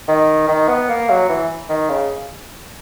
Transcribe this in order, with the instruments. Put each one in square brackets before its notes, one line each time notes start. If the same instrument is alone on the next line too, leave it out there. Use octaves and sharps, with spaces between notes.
[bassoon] D#3
D#3
B3
A#3
F#3
E3
D#3
C#3